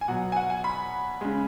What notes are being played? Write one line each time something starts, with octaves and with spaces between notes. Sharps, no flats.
G#5
B2 F#3 F#5
G#5
F#5
G#5
B5
C#3 G#3